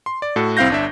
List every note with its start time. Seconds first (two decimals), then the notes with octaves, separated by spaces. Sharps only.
0.06 C6
0.22 D5
0.36 A2 F#4 A4
0.57 C2 C4 E4 F5 G6 A#6
0.70 G1 D4 E5